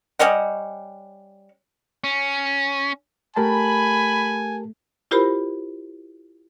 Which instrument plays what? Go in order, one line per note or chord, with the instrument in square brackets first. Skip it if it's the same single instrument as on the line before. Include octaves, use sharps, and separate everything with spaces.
[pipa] G3 C#4 D#5 F#5
[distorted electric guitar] C#4
[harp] A3 [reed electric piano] G4 A#4 A5 [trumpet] G#5 [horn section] B5
[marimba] E4 F4 G4 A#4 C5 B5